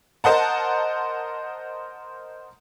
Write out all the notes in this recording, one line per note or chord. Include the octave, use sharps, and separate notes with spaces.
A#4 C5 D#5 F#5 A5